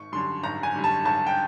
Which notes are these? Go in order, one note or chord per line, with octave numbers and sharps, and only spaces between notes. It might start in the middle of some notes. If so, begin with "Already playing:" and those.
Already playing: G#1 C#6
F#2 D3 G3 C6
G#1 A#5
G#5
F#2 D3 G3
A5
G#1 A5
G5